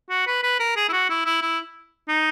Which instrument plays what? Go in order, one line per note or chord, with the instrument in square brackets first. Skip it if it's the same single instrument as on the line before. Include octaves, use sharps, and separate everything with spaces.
[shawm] F#4
B4
B4
A#4
G#4
E4
F#4
E4
E4
E4
D#4